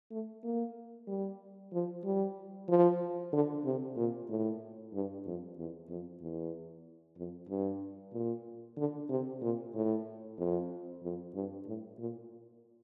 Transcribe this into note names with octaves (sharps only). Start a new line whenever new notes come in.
A3
A#3
G3
F3
G3
F3
D3
C3
A#2
A2
G2
F2
E2
F2
E2
F2
G2
A#2
D3
C3
A#2
A2
F2
F2
G2
A2
A#2